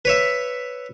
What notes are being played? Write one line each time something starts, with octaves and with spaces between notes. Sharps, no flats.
B4 C#5 E5